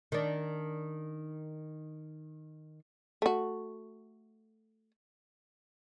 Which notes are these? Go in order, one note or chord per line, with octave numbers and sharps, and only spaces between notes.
D#3 D4
A3 F#4